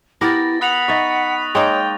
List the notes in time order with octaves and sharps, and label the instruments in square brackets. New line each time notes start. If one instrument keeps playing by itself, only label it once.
[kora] B3 G4 A#4 [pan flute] E4 [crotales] A6 A#6
[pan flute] F#5 [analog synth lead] B5 [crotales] D#6 F#6 F7
[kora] D#4 E5 [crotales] C#6 A6 A#6
[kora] G#3 A#3 D#4 [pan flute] C#5 [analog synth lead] G5